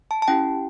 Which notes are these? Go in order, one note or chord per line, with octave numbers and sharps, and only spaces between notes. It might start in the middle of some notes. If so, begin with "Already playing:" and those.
A5
A5
C#4 E4 G4 G5